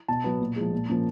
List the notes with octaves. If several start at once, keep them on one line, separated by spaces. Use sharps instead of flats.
B2 A5
F#3 B3
A#2
F3 G#3
A#2
F3 A#3 C#4